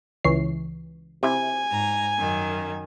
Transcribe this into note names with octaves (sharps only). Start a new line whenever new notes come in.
C#2 E3 C#5 C7
C3 E4 G#5
G#2 A#5
F#2 D#3